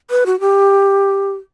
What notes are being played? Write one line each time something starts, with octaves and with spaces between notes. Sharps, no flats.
B4
F#4
G4